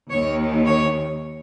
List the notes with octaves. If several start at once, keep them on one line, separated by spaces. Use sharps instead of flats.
D#2 D#3 C#5
C#5